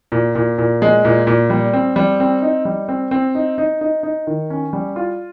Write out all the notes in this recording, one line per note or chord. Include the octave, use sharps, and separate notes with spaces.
A#2
A#2
A#2
G#3
A#2
A#2
G3
C4
G3
C4
D#4
G3
C4
C4
D#4
D#4
D#4
D#4
D#3
C#4
G3
F4